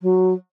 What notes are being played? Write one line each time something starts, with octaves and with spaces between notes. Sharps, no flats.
F#3